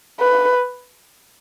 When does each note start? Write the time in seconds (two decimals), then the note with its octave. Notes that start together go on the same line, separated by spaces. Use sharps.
0.20 B4